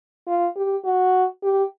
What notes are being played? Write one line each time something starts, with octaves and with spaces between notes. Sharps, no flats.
F4
G4
F#4
G4